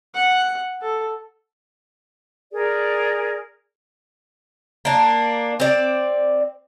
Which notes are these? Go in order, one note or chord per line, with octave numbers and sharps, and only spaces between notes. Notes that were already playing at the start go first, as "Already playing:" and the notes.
F#5
A4
G#4 A#4 D5
A#3 D4
C4 D5